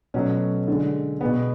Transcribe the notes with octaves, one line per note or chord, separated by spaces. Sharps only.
B2 F#3 A3 C#4
D3 G#3
B2 G#3 B3